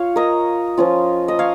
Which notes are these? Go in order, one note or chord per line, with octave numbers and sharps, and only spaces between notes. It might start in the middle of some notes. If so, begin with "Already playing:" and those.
Already playing: F4 C#5 F5
A#4 D#5
F3 C#4 F4
D#5
C#5 F5